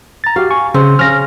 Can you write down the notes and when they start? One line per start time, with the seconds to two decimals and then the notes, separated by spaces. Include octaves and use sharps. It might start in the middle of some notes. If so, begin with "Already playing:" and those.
0.24 A#5 A6
0.36 F#4 G4 F5
0.51 G#5 C#6
0.74 C#3 C4
0.99 C#3 C#4 F6 A#6